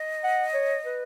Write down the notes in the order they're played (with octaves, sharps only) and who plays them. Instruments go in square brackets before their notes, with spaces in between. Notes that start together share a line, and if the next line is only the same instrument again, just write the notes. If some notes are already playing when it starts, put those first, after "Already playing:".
Already playing: [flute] D#5
[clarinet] F#5
C#5
B4